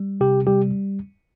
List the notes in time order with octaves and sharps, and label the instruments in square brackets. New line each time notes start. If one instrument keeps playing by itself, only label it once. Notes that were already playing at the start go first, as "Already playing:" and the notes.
Already playing: [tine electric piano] G3
C3 G4
G3 G4